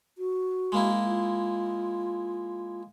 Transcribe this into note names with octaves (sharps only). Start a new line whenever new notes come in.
F#4
G#3 A#3 E4
F4